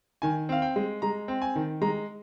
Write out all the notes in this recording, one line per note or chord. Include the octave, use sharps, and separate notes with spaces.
D#3 G#5
C4 F5
G5
G#3
G#3 A#5
C4
G#5
D#3
G#3 A#5